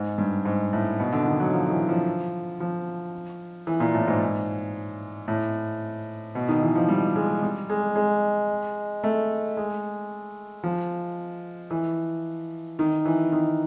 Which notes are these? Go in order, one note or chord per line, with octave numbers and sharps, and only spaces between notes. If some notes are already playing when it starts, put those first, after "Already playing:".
Already playing: G#2
G2
G#2
A2
B2
D3
D#3
F#3
F3
E3
F3
F3
E3
A#2
A2
G#2
A2
B2
D#3
E3
F3
G3
G#3
G3
G#3
G#3
A3
G#3
F3
E3
D#3
E3
D#3